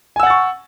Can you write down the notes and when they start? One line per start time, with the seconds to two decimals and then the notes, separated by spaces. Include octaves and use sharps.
0.16 G#5
0.20 E6
0.23 F#5
0.27 A6
0.30 C#6